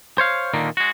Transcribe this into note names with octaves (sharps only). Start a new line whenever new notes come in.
C5 C#5 F5
A#2 D3 D#3 A#3
G#3 F#4